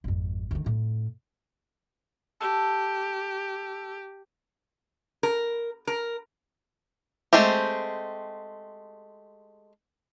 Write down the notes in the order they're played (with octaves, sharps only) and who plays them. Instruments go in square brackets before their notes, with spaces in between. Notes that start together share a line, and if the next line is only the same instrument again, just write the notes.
[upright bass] G#1 F2
D2 D#3
F2 A2
[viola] G4 [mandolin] A4
[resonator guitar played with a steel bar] A#4
A#4
[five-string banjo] G#3 A3 C4 G4